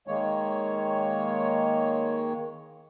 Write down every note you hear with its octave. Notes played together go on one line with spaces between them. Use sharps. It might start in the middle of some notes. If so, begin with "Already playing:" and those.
D#3 G#3 A#3 C#5